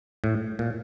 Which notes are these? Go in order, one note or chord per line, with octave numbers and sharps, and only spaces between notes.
A2
A#2